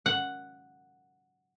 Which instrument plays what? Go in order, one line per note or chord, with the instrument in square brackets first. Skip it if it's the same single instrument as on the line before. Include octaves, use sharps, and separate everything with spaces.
[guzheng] F#5